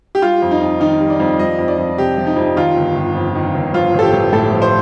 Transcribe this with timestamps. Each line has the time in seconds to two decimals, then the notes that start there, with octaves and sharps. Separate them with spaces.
0.15 G4
0.22 G3 F4
0.42 F2
0.51 D#4
0.61 F2
0.80 D#3 D#4
1.00 G3
1.10 D5
1.20 F2
1.39 F3 D#5
1.59 F2
1.68 D5
1.78 F2
1.98 C3 G4
2.18 F3
2.27 D#4
2.36 F2
2.56 D#3 F4
2.76 G1
2.96 G1
3.15 F2
3.35 D#3
3.55 G1
3.74 F3 F4
3.94 A1
3.99 A4
4.02 G4
4.12 A1
4.32 A2 A4
4.52 F3
4.62 C5